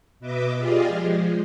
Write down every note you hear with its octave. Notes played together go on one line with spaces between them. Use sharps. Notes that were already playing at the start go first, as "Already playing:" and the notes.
B2 B4 D#5 E5 D6
F4 G4 G#4 D5 D#5 F5
F3 G#3